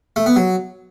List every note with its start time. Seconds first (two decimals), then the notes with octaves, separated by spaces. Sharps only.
0.16 A3
0.26 B3
0.36 F#3